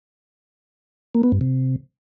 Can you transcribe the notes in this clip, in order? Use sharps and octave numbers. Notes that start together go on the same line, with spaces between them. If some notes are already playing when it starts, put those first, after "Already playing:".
A#3
B3
G2
C3